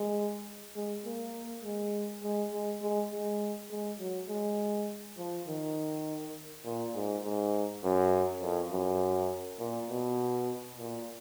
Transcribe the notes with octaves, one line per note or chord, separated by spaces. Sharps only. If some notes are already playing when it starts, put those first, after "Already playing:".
Already playing: G#3
G#3
A#3
G#3
G#3
G#3
G#3
G#3
G#3
F#3
G#3
F3
D#3
A#2
G#2
G#2
F#2
F2
F#2
A#2
B2
A#2